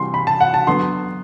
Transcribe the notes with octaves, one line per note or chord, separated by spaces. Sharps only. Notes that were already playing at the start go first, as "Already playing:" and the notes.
Already playing: C3 E3 G3 C6
B5
A5
F#5
A5
D3 F#3 B3 C6